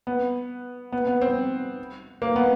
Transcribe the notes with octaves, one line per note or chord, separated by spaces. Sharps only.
B3
B3
B3
C4
A#3
B3